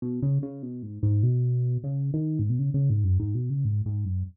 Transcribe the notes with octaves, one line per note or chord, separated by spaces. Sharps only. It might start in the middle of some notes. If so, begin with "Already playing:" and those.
B2
C#3
C#3
B2
G#2
G#2
B2
C#3
D#3
G#2
B2
C#3
C#3
G#2
F#2
G#2
B2
C#3
G#2
G#2
F#2